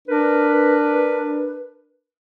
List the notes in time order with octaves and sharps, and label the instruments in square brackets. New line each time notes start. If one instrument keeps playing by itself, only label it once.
[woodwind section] D4 A#4 B4